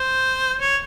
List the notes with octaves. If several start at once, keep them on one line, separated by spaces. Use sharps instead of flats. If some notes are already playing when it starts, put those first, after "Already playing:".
Already playing: C5
C#5